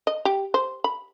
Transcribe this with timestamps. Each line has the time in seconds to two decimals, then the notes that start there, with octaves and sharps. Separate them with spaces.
0.07 D#5
0.25 G4
0.54 C5
0.84 B5